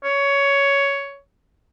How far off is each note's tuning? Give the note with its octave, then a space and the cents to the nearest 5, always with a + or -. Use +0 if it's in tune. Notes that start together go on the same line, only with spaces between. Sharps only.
C#5 +10